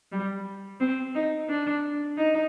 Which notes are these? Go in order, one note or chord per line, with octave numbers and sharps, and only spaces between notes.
G3
C4
D#4
D4
D#4